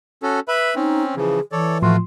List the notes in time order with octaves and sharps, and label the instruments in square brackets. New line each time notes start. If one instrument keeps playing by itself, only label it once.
[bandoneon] C#4 F#4 A4
B4 E5 B5
[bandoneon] C4 C#4 [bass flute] D#4
[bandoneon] C#3 E3 F3 [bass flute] G#4
[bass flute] E3 [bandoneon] A4 C#5 D5
[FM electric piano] A2 F3 C6 [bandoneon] A3 F4 F#4